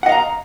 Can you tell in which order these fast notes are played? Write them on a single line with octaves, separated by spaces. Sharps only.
F#5 D#5 F5 A#5